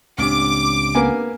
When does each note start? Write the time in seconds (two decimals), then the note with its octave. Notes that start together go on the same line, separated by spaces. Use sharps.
0.18 C#2 A2 C4 D4 G4 D6
0.95 A#3 B3 G#5